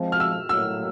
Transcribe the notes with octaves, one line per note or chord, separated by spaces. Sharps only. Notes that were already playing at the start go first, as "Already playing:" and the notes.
Already playing: F3 G#3 C4
F6
E6
A2 F#3 A#3 E6